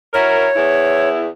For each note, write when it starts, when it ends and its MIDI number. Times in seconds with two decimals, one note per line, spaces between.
0.14 0.48 64
0.14 0.48 66
0.14 0.48 70
0.14 1.09 73
0.56 1.27 40
0.56 1.27 64